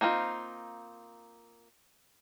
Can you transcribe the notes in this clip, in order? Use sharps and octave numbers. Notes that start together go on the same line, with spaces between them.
A#3 C4 D#4 F4